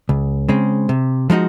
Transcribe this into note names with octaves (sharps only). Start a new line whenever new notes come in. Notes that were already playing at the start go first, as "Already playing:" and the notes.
C#2
C#3 G#3 C4
C3
F3 G#3 D#4 F#4